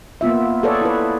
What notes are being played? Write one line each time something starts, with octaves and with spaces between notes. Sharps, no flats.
A#3 B3 F4 E5
G#4 A4 B4 C#5 D5
E4 B4